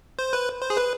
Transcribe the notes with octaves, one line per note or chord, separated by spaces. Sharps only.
C5
B4
C5
G#4
B4